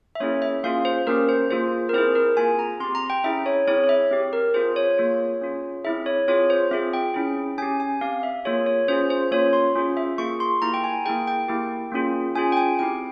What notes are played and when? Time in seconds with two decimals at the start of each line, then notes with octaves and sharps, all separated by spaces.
0.15 E5
0.20 A#3 C#4 E4 G#4 C#5
0.42 E5
0.63 A#3 C#4 F4 G#4 F5
0.85 C5
1.07 A#3 C#4 G4 A#4
1.29 C5
1.50 A#3 F4 G#4 C5
1.89 A#4
1.93 C4 E4 G#4 C5
2.15 A#4
2.37 A#3 F4 G#4 G#5
2.59 A#5
2.80 C4 G4 C6
2.95 A#5
3.10 G5
3.24 C#4 E4 G#4 E5
3.46 C#5
3.68 C4 E4 G#4 C#5
3.84 C#5
3.89 E5
4.11 C4 G4
4.33 A#4
4.54 C4 F4 G#4 C5
4.76 C#5
4.98 A#3 F4 G#4
5.41 C#4 F4 G#4
5.84 C4 E4 G#4 E5
6.06 C#5
6.28 C4 F4 G#4 C#5
6.50 C5
6.71 C4 F4 G#4 E5
6.93 G5
7.14 C#4 E4 G#4
7.58 C#4 G4 G#5
7.80 G#5
8.01 C4 G4 F5
8.23 E5
8.45 A#3 F4 G#4 C#5
8.66 C#5
8.88 C#4 F4 G#4 C5
9.10 C5
9.31 A#3 C#4 F4 C#5
9.53 C6
9.75 C#4 F4 G#4
9.97 E5
10.18 A#3 F4 G#4 C#6
10.40 C6
10.62 A#3 E4 G4 A#5
10.74 G5
10.84 G#5
11.06 A#3 E4 G#4 G5
11.27 G5
11.48 A#3 E4 G4
11.92 A#3 C#4 F4 G#4
12.35 C#4 F4 G#4 G#5
12.52 G5
12.57 G#5
12.79 C4 E4 G4 G5